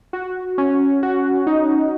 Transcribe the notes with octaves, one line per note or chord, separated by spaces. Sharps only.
F#4
C#4
F#4
D#4